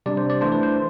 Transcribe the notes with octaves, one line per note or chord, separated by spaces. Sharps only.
C3 G3 D4 D5
C5
D5
E3 A3 D4 C5
B4
C5